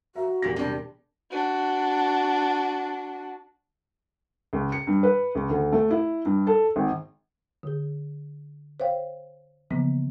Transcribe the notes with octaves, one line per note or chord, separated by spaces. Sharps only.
F#4 E5 A#5
E1 A#2 A#3 G4 A#6
C3 G3 D4
D4 F#4
C#2
C#7
G2
B4
C#2
D2
A3
E4
G2
A4
G#1
D3 G#4
C5 C#5 F5 G5
C#3 E3 F3 A#3 B3